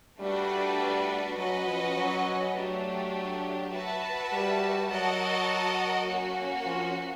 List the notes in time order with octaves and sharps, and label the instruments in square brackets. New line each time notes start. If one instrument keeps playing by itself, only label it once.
[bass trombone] G3 [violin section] A3 D4 F#4 B4 D5
[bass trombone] F#3 [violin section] C#4 F#4 B4 D#5
[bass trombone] F3
F#3
[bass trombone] F#3 [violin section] A3 D4 G4
[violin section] F#4 B4 E5 A5
[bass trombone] G3
[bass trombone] F#3 [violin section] F#4 A#4 D#5 F#5 A5
[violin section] A#3 C#4 F#4
[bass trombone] F3